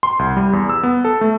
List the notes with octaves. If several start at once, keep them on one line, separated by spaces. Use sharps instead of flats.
C6
C2
G3
E2
E6
B3
A4
A3